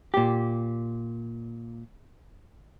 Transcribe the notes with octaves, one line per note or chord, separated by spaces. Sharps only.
A#2 G4